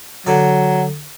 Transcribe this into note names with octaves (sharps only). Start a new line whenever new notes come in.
D3 F#3 D5